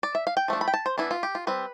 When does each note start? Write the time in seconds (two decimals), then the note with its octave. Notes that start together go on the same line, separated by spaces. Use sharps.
0.03 D5
0.15 E5
0.27 F5
0.37 G5
0.48 F3 A3 D4
0.61 B5
0.68 G5
0.74 A5
0.86 C5
0.98 E3 B3 D4 E4
1.11 F4
1.23 G4
1.35 F4
1.47 G3 C4 B4